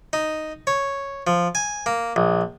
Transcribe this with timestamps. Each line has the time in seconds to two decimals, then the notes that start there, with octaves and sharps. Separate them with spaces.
0.13 D#4
0.67 C#5
1.27 F3
1.55 G#5
1.86 A#3
2.16 A#1